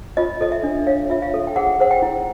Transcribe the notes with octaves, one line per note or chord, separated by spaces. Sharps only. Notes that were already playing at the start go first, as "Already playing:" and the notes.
F4 D#5
A4 D#5
E5
D4
C#5 F5
F4 E5
F5
A4
G5
G#4 F#5
C5 F#5
G5
E4